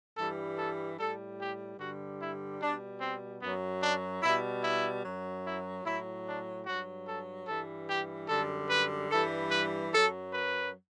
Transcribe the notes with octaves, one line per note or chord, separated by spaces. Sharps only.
G2 E3 G3 A4
A4
A2 G3 A4
G4
G2 D3 G3 F#4
E4
B2 G3 D4
C4
F#2 F#3 B3
D4
B2 G3 E4
E4
F#2 F#3
E4
A2 F#3 E4
D4
G2 F#3 F#4
A4
G2 E3 G3 A4
G4
F#2 D3 G3 A4
B4
G2 E3 G3 A4
B4
F#2 F#3 A4
B4